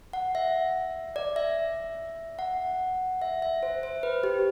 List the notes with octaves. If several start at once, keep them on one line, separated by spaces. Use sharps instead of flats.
F#5
E5
D5
E5
F#5
E5
E5
C5
C5
B4
G4